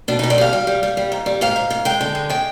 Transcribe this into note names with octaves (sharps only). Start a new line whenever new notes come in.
B2 D4
B2 D#4
D5
G3 F5
G3
G3
G3
G3
G#2
G3
G#2 F5
G#2
G#2
G#3 G5
D3
G#3
G#3 G5